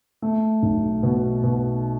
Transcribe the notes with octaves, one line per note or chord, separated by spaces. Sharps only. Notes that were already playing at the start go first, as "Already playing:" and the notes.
A3
B1
B2
B2